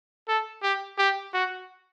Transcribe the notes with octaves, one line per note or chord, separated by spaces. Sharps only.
A4
G4
G4
F#4